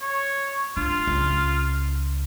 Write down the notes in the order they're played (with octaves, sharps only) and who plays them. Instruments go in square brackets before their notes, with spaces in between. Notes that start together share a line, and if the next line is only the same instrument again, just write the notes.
[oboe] C#5
[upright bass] D4 [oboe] F4
[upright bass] C#2